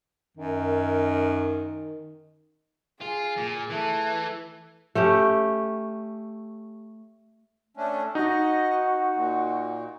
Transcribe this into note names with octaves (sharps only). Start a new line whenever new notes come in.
F#2 D#3
F4 G#4
A#2
E3 A3
A3 C#4 G4
A3 C#4 D4
D#4 F#4 D#5
A#2